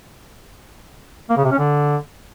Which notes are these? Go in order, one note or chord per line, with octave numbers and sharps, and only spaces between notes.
A#3
C#3
C3
C#4
D3